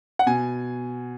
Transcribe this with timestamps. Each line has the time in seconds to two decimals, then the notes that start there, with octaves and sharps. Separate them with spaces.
0.19 F#5
0.26 B2 G#5